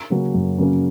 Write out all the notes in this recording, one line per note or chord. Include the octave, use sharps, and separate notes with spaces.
C#3 F#3 A#3 C#4
F#2
C#3 F#3 A#3 C#4